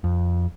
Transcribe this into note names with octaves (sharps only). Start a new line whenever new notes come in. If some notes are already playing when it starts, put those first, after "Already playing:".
F2